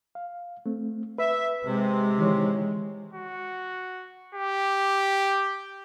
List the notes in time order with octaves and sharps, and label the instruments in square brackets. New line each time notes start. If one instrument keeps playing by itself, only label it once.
[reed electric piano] F5
A3 C4
[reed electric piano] B4 [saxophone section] E5
[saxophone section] C3 [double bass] G#3
[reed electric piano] D#3 E3 C#5
[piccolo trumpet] F#4
G4